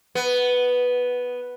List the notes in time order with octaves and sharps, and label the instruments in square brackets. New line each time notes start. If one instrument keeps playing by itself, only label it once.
[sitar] B3